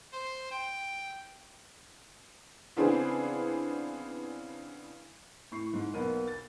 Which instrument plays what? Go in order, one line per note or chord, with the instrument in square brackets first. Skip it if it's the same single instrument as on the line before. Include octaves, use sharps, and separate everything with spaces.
[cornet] C5
G5
[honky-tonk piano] C#3 E3 B3 C4 D4 G#4
[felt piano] A2 C#6 C7
G#2
B1 A#3 B3 D#7
A6